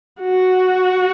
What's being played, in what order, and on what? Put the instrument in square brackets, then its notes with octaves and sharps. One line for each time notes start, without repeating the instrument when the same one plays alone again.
[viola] F#4